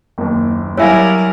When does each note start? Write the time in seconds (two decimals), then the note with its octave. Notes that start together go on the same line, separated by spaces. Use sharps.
0.18 F#1 D#2
0.77 F#3 G3 E4 A#4 C#5 E5 F5 G#5